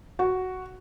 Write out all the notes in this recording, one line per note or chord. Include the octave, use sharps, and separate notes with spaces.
F#4